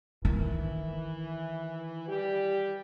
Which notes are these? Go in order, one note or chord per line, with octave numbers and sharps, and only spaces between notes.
D#3 E3
G3 G4